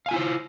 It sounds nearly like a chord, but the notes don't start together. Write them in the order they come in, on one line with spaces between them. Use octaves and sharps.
F5 G#5 F4 E4 C5